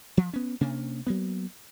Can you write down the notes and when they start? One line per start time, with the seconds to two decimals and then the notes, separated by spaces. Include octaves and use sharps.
0.17 F3
0.33 B3 C#4
0.61 C3 A#3 C#4 D4
1.07 F#3 A#3 B3